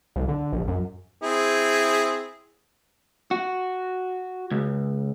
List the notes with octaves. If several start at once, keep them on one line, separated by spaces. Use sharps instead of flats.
C2
D3
A#1
F#2
C4 E4 G#4
F#4
C#2